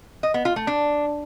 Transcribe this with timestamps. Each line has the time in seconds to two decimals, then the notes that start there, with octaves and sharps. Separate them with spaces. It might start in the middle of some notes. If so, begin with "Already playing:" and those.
0.23 D#5
0.34 B3
0.45 F4
0.56 A3
0.67 D4